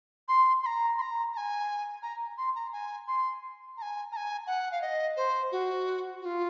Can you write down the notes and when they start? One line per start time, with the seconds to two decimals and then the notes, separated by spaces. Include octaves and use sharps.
0.28 C6
0.63 C6
0.66 A#5
0.98 C6
1.02 A#5
1.33 A#5
1.37 G#5
2.03 A#5
2.38 C6
2.55 A#5
2.72 G#5
3.08 C6
3.77 A#5
3.82 G#5
4.12 A#5
4.16 G#5
4.47 F#5
4.71 F5
4.82 D#5
5.16 C5
5.52 F#4
6.21 F#4
6.25 F4